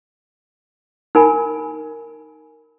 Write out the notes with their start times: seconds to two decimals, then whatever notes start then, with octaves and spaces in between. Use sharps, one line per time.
1.15 D#4 A#4 G#5 B5